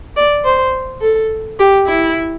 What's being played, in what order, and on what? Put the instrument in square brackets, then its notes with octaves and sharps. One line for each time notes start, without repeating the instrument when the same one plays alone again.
[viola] D5
C5
A4
G4
E4